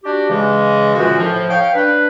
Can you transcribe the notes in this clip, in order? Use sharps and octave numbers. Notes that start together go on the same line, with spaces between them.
D4 F#4 G4
C#3 E3 G#3
F#2 A#2 D3 E3 F3 F#4
A2 F3
C#5 F5 G5
D4 B4